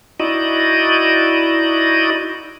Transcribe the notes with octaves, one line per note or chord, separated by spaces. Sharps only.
D#4 E4 F#4 D5 D#5